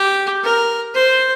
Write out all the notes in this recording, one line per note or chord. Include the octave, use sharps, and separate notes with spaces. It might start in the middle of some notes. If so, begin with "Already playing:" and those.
Already playing: G4
A#4
C5